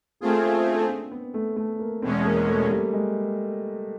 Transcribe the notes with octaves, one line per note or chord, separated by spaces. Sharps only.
A3 A#3 C4 F4 G#4
C#4
D4
C4
B3
A3
A3
A#3
E2 B2 G#3 C4 C#4
A#3
A3
G3
G#3